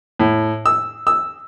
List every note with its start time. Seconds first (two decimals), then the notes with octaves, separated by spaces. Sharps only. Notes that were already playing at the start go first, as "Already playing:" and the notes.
0.20 A2
0.66 E6
1.07 E6